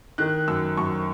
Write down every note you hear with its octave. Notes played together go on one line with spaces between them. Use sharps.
D#3 F#6
F#2 E6
F#2 C#6